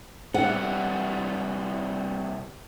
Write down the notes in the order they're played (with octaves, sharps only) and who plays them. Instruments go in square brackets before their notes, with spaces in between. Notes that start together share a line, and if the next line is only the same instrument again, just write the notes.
[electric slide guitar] C3 G3 B3 [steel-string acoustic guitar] F#5